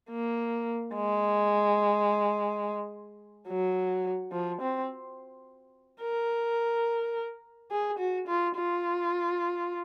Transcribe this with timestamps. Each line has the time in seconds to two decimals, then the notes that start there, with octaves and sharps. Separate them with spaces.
0.10 A#3
0.95 G#3
3.49 F#3
4.32 F3
4.61 C4
6.02 A#4
7.71 G#4
7.99 F#4
8.27 F4
8.56 F4